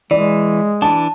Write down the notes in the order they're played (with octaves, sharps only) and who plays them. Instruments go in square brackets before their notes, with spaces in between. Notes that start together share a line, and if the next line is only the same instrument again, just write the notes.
[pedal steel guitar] E3 [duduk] G#3 [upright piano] D5
[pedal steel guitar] E3 D4 [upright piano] A5